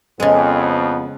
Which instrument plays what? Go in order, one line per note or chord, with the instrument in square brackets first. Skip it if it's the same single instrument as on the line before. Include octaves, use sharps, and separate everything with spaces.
[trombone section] F2 B3 [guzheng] C#3 G#3